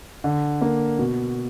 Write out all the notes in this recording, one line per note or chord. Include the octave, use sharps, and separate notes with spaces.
D3
A#3
B2